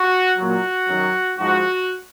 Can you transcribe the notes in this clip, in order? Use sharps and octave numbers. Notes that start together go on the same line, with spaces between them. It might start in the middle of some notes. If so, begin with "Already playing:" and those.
Already playing: F#4
A#2 F#3 F#4
F#2 D#3 F#3
G#2 F3 F#4